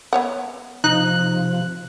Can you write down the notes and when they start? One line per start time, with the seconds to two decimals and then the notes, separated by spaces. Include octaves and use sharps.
0.13 B3 C#5 F#5
0.84 C3 F3 D#4 F#6